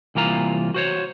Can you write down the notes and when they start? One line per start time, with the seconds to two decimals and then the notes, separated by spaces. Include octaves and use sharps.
0.15 C2 E3 A#3 F4 A#5
0.74 F#4 C5 C#5